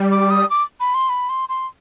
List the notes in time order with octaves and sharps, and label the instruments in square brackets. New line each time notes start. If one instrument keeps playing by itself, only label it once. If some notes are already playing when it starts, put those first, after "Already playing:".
Already playing: [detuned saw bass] G3
[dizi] D6
D#6
D6
B5
C6
B5
C6
C6